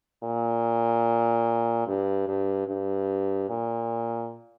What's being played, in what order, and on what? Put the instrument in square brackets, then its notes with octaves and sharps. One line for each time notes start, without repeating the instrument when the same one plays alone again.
[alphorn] A#2
G2
G2
G2
A#2